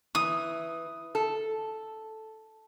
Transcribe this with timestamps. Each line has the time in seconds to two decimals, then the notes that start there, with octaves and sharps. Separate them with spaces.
0.15 E3 D#6
1.15 A4